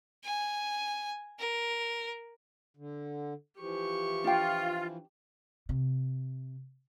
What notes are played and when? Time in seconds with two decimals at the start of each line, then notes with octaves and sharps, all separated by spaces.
0.24 G#5
1.39 A#4
2.77 D3
3.60 E3 F3 G4 C#6
4.24 D4 F4 G5
5.69 C3